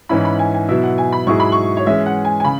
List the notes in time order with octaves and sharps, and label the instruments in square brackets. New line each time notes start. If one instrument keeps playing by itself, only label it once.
[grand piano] G#2 E3 C#4 E4 [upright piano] B5
[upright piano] B5
G#5
G#5
[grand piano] B2 F#3 E4 [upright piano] E5
[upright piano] F#5
G#5
B5
[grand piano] G#2 F#3 E4 G#4 [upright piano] C#6
[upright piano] B5
C#6
C#5
[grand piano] E3 G#3 C#4 G#4 [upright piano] E5
[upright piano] F#5
G#5
G#5
[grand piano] C#3 [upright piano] B5